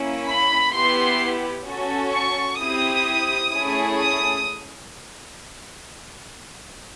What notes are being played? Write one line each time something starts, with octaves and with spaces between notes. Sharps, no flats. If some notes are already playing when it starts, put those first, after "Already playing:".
Already playing: A#3 C#4 E4
B5
B3 E4 G4 C6
C#4 F#4 A4
C#6
C4 E4 G4 D#6
A3 C#4 E4 G#4
D#6